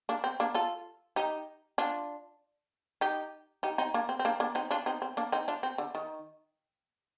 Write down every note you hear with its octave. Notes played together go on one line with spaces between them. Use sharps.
A#3 D4
C4
A#3 D4
F4 A4
D#4 G4
D4 F4
D#4 G4
D#4 G4
C4 D#4
A#3 D4
C4
C4
A#3 D4
A#3 D4
C4 D#4
D4 F4
C4 D#4
C4
A#3 D4
C4 D#4
D4 F4
C4
D3
D#3